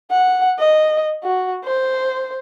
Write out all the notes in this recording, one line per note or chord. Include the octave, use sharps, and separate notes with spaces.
F#5
D#5
F#4
C5